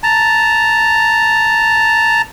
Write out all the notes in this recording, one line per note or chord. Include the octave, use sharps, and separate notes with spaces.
A5 A#5